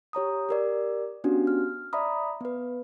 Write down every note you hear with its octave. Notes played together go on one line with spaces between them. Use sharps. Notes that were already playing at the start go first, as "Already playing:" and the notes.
G4 C#5 A#5 D#6
G4 A#4 D5
B3 C#4 D4 F#4 G4
F6
D5 E5 A#5 B5 D#6
B3 B4